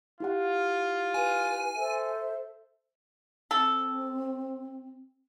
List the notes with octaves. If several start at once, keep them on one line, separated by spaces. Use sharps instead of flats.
E4 F4 G4 F#5
B4 G#5
A4 C5 E5
C4 A4